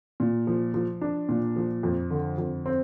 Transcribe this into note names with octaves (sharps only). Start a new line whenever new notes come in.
A#2
F3
F3
D4
A#2
F3
F2
D3
F2
C4